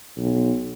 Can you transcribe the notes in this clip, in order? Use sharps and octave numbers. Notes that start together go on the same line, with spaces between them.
B1